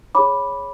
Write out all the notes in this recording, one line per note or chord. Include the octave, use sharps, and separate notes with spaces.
G#4 C#5 B5 D6